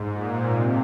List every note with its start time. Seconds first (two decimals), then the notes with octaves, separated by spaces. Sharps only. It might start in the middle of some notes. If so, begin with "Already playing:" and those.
Already playing: G#2
0.12 A#2
0.53 C3